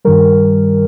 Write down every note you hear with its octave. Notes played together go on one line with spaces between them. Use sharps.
G2 D#3 G3 A#4